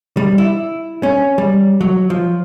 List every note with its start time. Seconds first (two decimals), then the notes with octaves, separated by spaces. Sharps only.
0.17 G3
0.38 E4
1.03 C#4
1.38 G3
1.81 F#3
2.10 F3